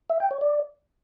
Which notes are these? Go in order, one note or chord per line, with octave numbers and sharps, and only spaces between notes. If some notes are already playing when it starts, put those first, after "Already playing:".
E5
G5
C#5
D5